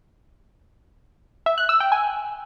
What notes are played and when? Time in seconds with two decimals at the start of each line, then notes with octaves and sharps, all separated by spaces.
1.46 E5
1.58 F#6
1.69 E6
1.80 G5
1.92 G#5